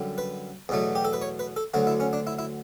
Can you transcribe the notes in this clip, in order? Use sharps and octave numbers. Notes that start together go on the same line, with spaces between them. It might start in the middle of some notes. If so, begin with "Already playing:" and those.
Already playing: F#2 D3 G3
B4
E2 B2 F#3 A3
G4
A4
B4
C#5
B4
A4
D2 D3 F#3 F#4
E4
C#4
D4
E4
E4